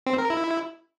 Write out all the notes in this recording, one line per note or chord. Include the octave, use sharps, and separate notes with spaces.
C4
A#4
E4